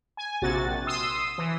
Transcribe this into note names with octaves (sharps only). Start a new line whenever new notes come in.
G#5
A#1 C3 F#4 A6
C6 D#6 E6
E3